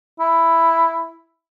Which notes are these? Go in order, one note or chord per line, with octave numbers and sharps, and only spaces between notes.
E4